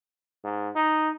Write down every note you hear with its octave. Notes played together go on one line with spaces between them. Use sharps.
G#2
D#4